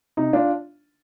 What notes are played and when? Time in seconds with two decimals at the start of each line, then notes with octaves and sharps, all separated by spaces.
0.17 C3 D#4
0.33 D4 F4